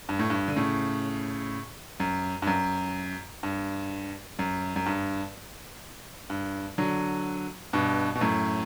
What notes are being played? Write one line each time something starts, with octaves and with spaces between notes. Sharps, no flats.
G2
A2
G2
D3
A2 C#3
F#2
G2
F#2
G2
F#2
F#2
G2
G2
D3 F#3
G2 B2
B2
F#2 A2